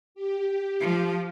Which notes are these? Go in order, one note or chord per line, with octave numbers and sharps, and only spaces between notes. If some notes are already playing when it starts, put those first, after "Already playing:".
G4
F3